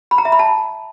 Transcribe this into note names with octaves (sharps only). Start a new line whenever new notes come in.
B5
A#5
E5
B5
A5